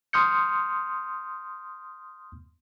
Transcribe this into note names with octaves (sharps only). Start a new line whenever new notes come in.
C6 D#6 F6 G6 C#7